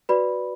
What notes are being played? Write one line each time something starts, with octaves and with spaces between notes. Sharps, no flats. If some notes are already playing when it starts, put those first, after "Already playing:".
F#4 B4 D5 B5